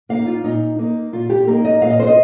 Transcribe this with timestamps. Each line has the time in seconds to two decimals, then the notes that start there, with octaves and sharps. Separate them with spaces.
0.09 A#3 D#4 F5
0.26 F4
0.44 A#2 D#4
0.79 A#3 D#4
1.13 A#2 F4
1.30 G4
1.47 A#3 D#4 A#4
1.65 D#5
1.82 A#2 F5
1.90 D#5
1.99 C5
2.07 D#5